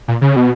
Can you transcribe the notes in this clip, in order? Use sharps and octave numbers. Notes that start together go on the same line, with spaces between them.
A#2
C#3
B2